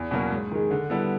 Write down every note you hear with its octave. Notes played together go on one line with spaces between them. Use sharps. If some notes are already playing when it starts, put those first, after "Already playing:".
Already playing: E2
B2 F#3 A#3 C#4
G#2
D#3 G#3
D3
G3 B3 E4 A4